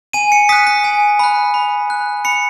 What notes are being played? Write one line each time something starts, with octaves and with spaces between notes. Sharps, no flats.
G#5 D#7
C#7
D#6 F#6 B6
B6
G#5
B5 F#6
B5
F#6
B5 C#7